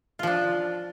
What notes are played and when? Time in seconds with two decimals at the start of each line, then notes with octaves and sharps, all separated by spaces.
0.19 F4
0.23 F3
0.27 D4